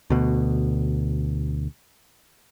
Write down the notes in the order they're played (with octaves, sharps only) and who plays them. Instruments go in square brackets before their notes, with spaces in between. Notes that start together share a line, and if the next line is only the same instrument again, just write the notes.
[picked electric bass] D2 B2